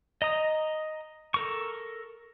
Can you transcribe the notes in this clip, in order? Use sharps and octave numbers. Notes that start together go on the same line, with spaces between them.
D#5 A#5 D#6
A4 A#4 C#6